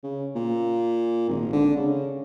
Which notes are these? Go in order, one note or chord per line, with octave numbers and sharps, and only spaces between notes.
C#3
A#2
G#1
D3
C#3